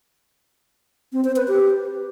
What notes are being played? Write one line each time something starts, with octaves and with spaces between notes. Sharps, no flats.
C4
C5
B4
G4